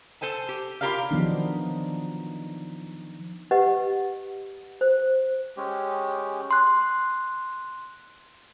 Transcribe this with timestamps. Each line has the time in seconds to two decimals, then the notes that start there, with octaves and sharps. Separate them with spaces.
0.21 A4 C5 G#5 A5
0.49 G4
0.81 E4 F4 G4 A#4 D5 F5
1.11 D#3 F3 F#3 B3 D4 D#4
3.51 G4 B4 D#5 F#5
4.81 C5
5.57 G#3 C#4 G4
6.51 C6 F#6